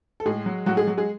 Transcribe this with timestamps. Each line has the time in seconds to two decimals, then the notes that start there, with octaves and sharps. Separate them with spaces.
0.20 A4
0.25 A2 G#3 G#4
0.46 F#3
0.66 A2 F#3 F#4
0.77 G#3 G#4
0.87 F#3
0.98 G#3 G#4